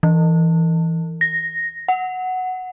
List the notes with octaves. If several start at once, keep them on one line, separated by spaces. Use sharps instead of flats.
E3
A#6
F#5